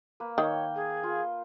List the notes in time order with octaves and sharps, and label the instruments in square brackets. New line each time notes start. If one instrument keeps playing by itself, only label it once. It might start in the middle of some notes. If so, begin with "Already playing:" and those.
[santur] A#3 B4
[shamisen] D#3 [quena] C#5 [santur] G5
[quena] G#4
[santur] F4